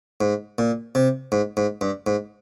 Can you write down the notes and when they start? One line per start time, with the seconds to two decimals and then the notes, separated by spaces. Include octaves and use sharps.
0.21 G#2
0.58 A#2
0.95 C3
1.32 G#2
1.57 G#2
1.81 G2
2.07 G#2